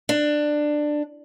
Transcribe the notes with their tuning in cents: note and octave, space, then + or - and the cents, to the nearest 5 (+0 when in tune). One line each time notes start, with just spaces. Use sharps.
D4 +15